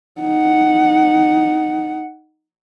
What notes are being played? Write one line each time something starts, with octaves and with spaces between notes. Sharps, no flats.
D#4 F#5